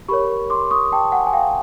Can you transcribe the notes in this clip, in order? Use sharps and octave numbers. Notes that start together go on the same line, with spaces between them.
G4 A#4 C#5 B5 C#6
C6 D6
C#6 D#6
G5 A5
F#5 G#5
G#5
F5 G5